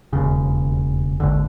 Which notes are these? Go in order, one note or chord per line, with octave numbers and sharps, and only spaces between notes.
E1 D#2 C#3
G#1 D#2 D3